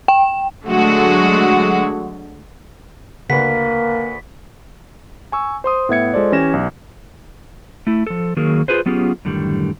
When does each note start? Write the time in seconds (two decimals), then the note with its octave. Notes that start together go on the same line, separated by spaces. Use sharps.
0.08 G5
0.66 D3 F#3 G#3 A3 F#4
3.30 D2 C#3 A#3 B4 F#5 B6
5.32 G#5 C#6 E6
5.64 C5 C6 D#6
5.89 A2 B3 E5 G#6 C#7
6.14 G#3 F4 A4 C5 D5
6.32 E3 C#4 G4 A#6 E7
6.53 B1
7.87 A3 E4
8.07 F3 A4
8.37 D#3 F#3 A#3 G#4 A#4
8.68 F4 G#4 B4 C5
8.86 F#3 B3 C#4 F4 G4 G#4
9.25 F#2 A2 D3 D#3 G3